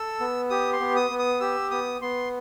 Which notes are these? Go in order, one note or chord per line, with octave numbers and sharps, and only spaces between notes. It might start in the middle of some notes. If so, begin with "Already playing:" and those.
Already playing: A4 E6
B3
G4 D#6
C6
B3
D#6
B3
D#6
G4 E6
B3 D#6
B3 C6